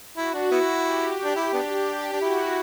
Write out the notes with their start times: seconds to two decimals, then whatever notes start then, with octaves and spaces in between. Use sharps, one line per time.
0.17 E4 F#4
0.34 D4
0.51 B3 E4
0.85 G4
1.24 D4
1.36 E4
1.53 B3 D4
1.87 G4
2.13 D4
2.21 E4 F#4